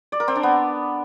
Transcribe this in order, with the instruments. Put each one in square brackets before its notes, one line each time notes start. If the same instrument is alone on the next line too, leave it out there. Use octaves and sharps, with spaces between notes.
[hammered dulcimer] D5
A#4
C4
D4
B3